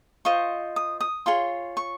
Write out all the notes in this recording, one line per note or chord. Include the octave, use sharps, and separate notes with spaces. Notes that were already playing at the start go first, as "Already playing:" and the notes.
F4 C5 D#5 C#6
D#6
D#6
F4 G#4 C#5 C6
C#6